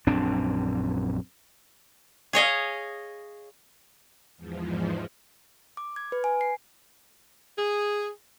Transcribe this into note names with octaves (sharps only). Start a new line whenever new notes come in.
A#1 F#2 C4 D4
G#4 C#5 D#5 F5
E2 G#2 F3
D6
G#6
B4
G#5
C7
G#4